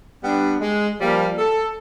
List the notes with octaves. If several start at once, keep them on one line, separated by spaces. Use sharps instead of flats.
G3 B3 D4
G#3
F3 G3 A#3
A4